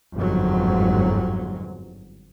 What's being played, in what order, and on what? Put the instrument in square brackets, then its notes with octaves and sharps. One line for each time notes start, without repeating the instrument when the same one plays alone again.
[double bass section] G1 F2 G#2 F#3